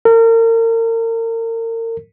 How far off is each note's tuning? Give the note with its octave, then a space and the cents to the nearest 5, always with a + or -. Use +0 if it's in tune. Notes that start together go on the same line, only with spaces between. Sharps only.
A#4 -35